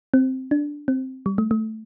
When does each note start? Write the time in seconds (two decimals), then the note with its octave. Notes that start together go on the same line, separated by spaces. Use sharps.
0.14 C4
0.51 D4
0.88 C4
1.26 G3
1.38 A3
1.51 A3